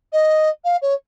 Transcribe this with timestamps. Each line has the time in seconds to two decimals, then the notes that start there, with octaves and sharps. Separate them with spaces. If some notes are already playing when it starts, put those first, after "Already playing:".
0.12 D#5
0.64 F5
0.81 C#5